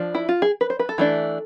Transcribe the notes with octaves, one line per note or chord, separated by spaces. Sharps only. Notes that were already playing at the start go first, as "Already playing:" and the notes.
Already playing: F3 D4
E4
F4
G#4
B4
C5
B4
A4
E3 A3 D4